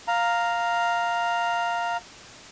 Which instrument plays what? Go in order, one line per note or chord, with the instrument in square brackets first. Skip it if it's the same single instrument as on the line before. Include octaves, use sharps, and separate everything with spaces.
[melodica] F5 A#5